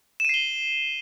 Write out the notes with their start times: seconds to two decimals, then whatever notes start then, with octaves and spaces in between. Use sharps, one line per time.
0.20 E7
0.25 D#7
0.29 C7
0.34 G7